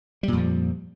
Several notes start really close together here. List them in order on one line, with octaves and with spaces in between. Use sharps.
G3 A#2 F2 F3